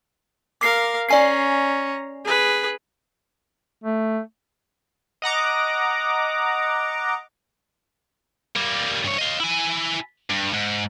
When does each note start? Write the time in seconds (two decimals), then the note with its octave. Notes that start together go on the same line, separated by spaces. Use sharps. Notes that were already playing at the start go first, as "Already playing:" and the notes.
0.61 A#4 F5 D6 C7
1.09 C#4 D5 G#5 A#5 C7
2.25 G#4 B4
3.84 A3
5.22 D#5 F#5 A#5 D6
8.56 G3 A#3
9.05 G2 C#5
9.18 D#5 F5
9.40 E4 G#5
10.30 G2
10.53 G#2